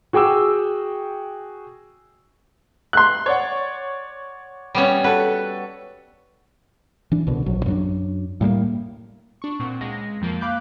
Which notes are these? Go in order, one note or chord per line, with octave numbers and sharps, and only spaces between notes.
F#4 G#4 G5 D6 E6
C6 F#6
C#5 D5 F#5
G3 B3 C#4
F#4 A4 B4
E3 D4
C2 B2 D3
A#1 F#3
F#2 F#3 D4
A2 G3 G#3 A#3
D4 C#6
A#2 C4 F#5
C#2 G#3 A#6
F2 F3 A#3
F5 B5 D6 F#6 G6